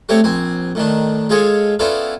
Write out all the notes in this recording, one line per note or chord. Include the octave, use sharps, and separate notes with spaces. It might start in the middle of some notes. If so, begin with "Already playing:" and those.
G3 A3 C4 C#5
A#1 C4 G#5
A2 D#3 D4
G#3 F4 G#4 A4 C#5
B3 C#4 E4 F4 A4 D5